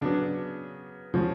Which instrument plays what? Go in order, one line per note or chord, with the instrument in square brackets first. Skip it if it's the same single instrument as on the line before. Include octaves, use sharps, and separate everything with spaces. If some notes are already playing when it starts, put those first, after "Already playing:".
[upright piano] C#3 F#3 B3 [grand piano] D4
[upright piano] C#3 G#3 C#4 F#4 C#5 [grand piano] F3